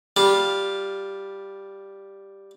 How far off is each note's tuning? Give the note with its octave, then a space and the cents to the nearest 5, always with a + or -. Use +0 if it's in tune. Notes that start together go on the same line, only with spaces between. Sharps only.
G3 +0 F4 +5